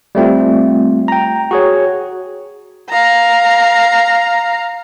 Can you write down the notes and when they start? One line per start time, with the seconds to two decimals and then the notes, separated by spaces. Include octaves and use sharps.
0.15 G3 A3 C4 F4
1.08 G5 A#5
1.51 F#4 G#4 C#5
2.90 F5 A#5